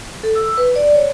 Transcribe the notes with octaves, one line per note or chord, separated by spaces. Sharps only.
A4
E6
B4
D5
C#5